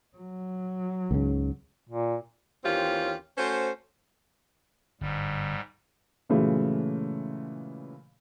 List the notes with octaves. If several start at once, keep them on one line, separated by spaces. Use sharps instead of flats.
F#3
C#2 G#2 C#3
A#2
D#2 E3 C4 C#4 F4 G4
A3 C#4 F#4 C5
G1 G#2 G3
A#2 C#3 E3 F#3 G#3 A3